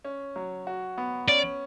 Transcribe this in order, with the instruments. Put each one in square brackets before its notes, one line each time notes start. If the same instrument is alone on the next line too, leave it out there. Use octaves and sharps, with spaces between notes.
[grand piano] C#4
F#3
F#4
B3
[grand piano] C#4 [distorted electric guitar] D5